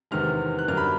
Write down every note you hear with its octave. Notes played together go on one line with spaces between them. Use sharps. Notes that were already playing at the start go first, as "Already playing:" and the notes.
E2 C3 D#3 G#3 F6
F#6
F#2 D3 G3 A#3 F6
B5